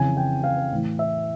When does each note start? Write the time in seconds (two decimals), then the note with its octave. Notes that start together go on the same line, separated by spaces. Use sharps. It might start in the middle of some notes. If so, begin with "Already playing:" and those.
Already playing: F2 C#3 E3 G#5
0.17 G5
0.44 F5
0.72 A2 E3
0.99 E5